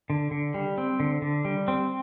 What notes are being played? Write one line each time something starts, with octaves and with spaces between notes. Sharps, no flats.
D3
D3
G3
C4
D3
D3
G3
C4